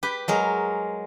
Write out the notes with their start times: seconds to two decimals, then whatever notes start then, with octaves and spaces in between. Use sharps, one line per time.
0.03 G4 B4
0.28 F#3 G#3 A#4